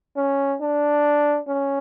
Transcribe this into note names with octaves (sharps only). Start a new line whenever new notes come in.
C#4
D4
C#4